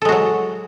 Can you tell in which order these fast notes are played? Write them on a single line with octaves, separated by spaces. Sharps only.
A4 G#3 F#4 F#3